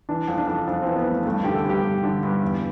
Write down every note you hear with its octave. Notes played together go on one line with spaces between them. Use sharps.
E3 D4
F2
D4
F2
F2 D4
E3 C4
B3
F2
A3
G2 A3
D3 G4
A4
G2 G4
G2
D3
G2
E2